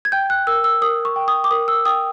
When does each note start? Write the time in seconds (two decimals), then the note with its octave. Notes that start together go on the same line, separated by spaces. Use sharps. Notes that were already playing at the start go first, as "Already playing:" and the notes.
0.05 G#6
0.12 G5 G6
0.30 F#6
0.47 A#4 E6
0.64 E6
0.81 A#4 D#6
1.05 C#6
1.16 G5
1.28 D#6
1.44 D6
1.51 A#4 D#6
1.68 E6
1.85 G5 D#6